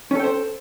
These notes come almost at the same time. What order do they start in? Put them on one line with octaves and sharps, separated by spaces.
C#4 A4 G5 C5